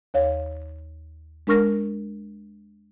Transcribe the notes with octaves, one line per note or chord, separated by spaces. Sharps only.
D#2 C#5 F5
G#3 D4 A#4 C#6 F6 A#6